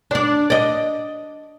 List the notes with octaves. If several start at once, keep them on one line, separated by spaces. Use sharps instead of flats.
D4 D5
D5 D#5